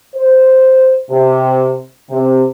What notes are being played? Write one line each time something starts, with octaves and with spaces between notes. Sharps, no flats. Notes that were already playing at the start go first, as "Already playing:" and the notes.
C5
C3
C3